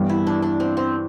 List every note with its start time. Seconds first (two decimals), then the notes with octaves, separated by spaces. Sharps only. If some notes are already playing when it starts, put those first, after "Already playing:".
Already playing: G2 E3 G3 B3
0.09 E4
0.27 D4
0.42 D4
0.60 C4
0.77 C4